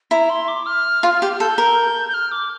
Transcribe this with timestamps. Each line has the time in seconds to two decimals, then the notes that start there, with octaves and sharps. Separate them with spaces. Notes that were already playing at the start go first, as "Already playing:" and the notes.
0.11 E4 A#5
0.30 C6
0.48 D6
0.66 F6
1.03 F4
1.22 G4
1.40 A4 G6
1.58 A#4
2.09 G6
2.14 F6
2.32 D6